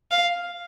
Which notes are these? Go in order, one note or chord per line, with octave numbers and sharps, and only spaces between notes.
F5